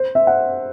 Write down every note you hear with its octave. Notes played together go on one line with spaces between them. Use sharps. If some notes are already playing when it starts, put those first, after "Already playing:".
Already playing: C5
E5
F#5